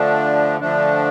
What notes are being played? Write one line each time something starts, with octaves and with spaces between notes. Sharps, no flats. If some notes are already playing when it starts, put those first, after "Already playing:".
Already playing: D3 F3 A3 D4
D3 F3 A3 D4